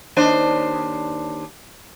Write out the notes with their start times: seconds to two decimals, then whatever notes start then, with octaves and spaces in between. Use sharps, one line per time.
0.17 D#2 D4 C5